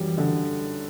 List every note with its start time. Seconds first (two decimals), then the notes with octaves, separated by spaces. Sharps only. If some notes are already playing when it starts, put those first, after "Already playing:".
Already playing: F#2 E3 G3
0.18 D3